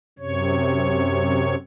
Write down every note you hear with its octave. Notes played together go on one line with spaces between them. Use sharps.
F#2 C3 C#5